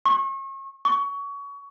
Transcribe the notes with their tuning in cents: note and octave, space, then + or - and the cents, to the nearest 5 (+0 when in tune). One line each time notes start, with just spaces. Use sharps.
C#6 -35
C#6 +25